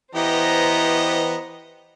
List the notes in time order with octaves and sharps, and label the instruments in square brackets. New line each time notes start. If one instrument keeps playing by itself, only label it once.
[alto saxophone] E3 [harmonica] B3 G4 D#5 [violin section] C5 A#5